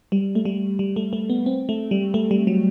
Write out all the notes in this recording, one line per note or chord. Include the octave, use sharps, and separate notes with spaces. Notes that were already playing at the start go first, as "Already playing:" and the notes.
G3
A3
G3
G3
A3
A3
B3
C4
A3
G3
A3
G3
F#3